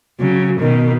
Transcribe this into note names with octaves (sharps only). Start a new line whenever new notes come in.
C#3 F#3
B2 D#3